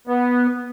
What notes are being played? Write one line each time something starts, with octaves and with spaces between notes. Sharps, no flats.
B3